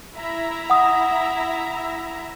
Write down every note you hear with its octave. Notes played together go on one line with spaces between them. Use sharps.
E4 E5 A#5
F#5 D#6